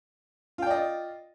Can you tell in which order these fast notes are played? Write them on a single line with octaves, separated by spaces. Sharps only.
F4 G5 D5 D#5